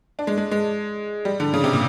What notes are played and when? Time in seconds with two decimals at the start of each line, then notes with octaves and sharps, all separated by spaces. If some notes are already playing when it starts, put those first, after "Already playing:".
0.19 D4
0.27 G#3
0.37 G#3
0.51 G#3
1.25 G3
1.40 D3
1.54 C#3
1.64 C3
1.73 A#2